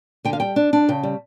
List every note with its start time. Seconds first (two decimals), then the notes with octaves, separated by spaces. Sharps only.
0.25 D3 G5
0.33 F5
0.40 G3 G5
0.56 D4
0.73 D4
0.89 C#3 G5
1.03 G3